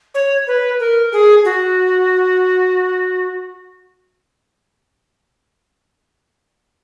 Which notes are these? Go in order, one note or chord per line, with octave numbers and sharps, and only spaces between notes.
C#5
B4
A#4
G#4
F#4